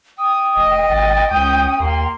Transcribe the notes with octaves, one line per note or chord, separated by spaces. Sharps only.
G5 D#6
F1 D#5
G#1 A6
C#2 C#4 D#6 G6
D#2 A#3 C6